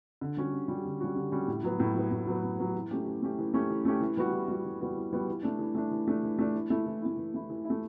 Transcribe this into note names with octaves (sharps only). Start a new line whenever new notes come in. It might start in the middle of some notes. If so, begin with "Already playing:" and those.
D3
G3 C#4 F#4
D3
G3 C#4 F#4
D3
G3 C#4 F#4
D3
G3 C#4 F#4
A2
F#3 B3
A2
F#3 B3
A2
F#3 B3
A2
F#3 B3
E3
A3 C#4 G4
E3
A3 C#4 G4
E3
A3 C#4 G4
E3
A3 C#4 G4
E3
G3 B3 F#4
E3
G3 B3 F#4
E3
G3 B3 F#4
E3
G3 B3 F#4
E3
A3 D4
E3
A3 D4
E3
A3 D4
E3
A3 D4
E3
A3 E4
E3
A3 E4
E3
A3 E4
E3
E4
A3